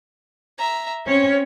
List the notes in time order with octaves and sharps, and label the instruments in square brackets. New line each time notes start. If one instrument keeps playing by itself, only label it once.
[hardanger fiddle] E5 A#5
[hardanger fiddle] C4 [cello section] C#4 C#5